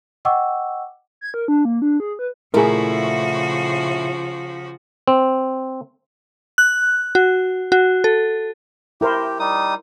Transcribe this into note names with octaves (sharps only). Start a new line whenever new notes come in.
D#5 F#5 G5 C#6 D6 E6
G#6
A#4
D4
A#3
D4
G#4
B4
A#2 C#3 F3 A3 E4 F#4 G#4 A#4
C4
F#6
F#4
F#4
A4
E4 G4 A#4 C5
G3 D#4 D#6